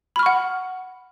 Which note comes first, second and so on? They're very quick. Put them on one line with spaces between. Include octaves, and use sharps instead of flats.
B5 F6 C#6 F#5